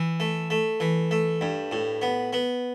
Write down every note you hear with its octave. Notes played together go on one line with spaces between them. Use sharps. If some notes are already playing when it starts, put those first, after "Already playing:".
Already playing: E3
A3
A3
E3
A3
G2
A2
B3
B3